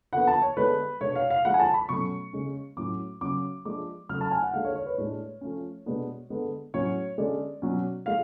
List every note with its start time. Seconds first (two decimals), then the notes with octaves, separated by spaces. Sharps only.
0.13 D3 F3 B3 F#5
0.27 A5
0.42 C#5
0.57 D3 G#3 B3 D4 B4
1.01 B2 G#3 B3 D4 C#5
1.16 F5
1.30 F5
1.45 D3 F3 G#3 F#5
1.54 G#5
1.60 A5
1.74 B5
1.89 B2 F#3 A3 C#4 C#6
2.33 C#3 G#3 C#4
2.77 A2 F#3 C#4 D6
3.21 C#3 F#3 C#4 D6
3.65 F3 G#3 D4 D6
4.09 C#3 F#3 A3 F6
4.21 A5
4.31 G#5
4.42 F#5
4.54 D3 G#3 D4 F5
4.64 C#5
4.75 C#5
4.86 B4
4.98 A2 G#3 D4 C#5
5.41 F3 A3 C#4
5.86 B2 G#3 B3 D4
6.30 D3 G#3 B3
6.74 A2 F#3 C#4 C#5
7.18 D3 G#3 C#4 D5
7.62 B2 F#3 C#4
8.06 F3 G#3 F5